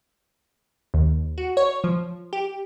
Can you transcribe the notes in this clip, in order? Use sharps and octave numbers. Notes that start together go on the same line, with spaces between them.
D#2
F#4
C#5
F3
G4